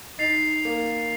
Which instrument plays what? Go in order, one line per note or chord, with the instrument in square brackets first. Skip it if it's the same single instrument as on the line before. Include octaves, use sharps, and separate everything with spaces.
[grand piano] D#4 [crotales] A6 C7 F7
[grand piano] A#3